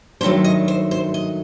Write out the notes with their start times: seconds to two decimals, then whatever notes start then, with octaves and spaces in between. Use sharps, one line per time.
0.21 G2 D#3 F#3 A3 C5
0.44 D#5
0.68 C5
0.91 C5
1.14 D#5